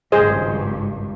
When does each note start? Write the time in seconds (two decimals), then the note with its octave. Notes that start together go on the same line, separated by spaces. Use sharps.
0.12 G#1 C#2 G2 G#4 C5 D#5